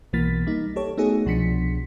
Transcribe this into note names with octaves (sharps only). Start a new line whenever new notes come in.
B1 B2 E3 A#3 A6 B6
G3 A#3 D#4
G4 A4 C#5
A3 B3 D#4 F#4 G#4
C2 B2 F3 D4 B6 C#7